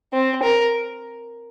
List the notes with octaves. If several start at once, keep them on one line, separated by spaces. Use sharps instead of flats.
C4
A#4